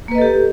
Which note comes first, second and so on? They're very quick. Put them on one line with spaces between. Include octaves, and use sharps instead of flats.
A#3 B4 D#5 A4 G4